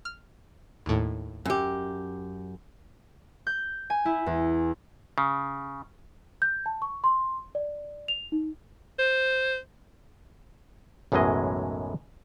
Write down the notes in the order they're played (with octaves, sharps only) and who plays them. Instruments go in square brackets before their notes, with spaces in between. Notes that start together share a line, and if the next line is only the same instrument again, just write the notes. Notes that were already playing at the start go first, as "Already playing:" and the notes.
[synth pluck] F6
D#2 A2
[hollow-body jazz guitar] F#2 G4
[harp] G6
G#5
E4
E2
[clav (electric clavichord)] C#3
[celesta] G6
A5
C#6
C6
D5
F7
D#4
[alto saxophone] C5
[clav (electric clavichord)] B1 F#2 A2 E3 G#3 D#5